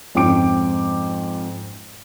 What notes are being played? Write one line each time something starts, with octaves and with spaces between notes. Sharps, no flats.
F2 G#2 C#4 G5 D6 D7